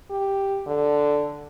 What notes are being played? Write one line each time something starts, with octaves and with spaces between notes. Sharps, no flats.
G4
D3